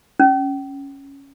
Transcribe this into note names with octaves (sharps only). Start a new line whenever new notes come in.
C#4